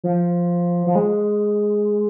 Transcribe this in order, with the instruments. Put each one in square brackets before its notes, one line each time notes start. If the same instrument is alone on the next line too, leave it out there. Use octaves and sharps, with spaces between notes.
[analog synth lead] F3
F3
G#3